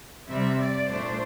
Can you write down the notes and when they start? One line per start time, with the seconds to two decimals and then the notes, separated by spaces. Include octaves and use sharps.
0.28 C3 G3 C4 E5
0.60 D5
0.90 A#2 A3 D4 C5